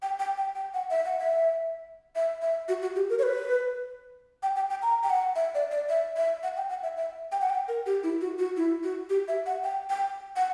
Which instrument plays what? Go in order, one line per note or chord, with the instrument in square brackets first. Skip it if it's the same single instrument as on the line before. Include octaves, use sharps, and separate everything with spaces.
[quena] G5
G5
G5
G5
F#5
E5
F#5
E5
E5
E5
F#4
F#4
G4
A#4
C#5
B4
G5
G5
G5
A#5
G5
F#5
E5
D5
D5
E5
E5
F#5
G5
F#5
E5
E5
G5
F#5
G5
A#4
G4
E4
F#4
F#4
E4
F#4
G4
E5
F#5
G5
G5
F#5